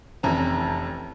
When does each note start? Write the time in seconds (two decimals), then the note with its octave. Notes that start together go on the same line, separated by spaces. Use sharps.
0.23 F1 F2 E3 C#4 A#5